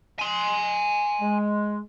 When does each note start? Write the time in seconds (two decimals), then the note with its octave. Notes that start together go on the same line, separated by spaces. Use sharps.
0.19 G#5 C6
1.20 G#3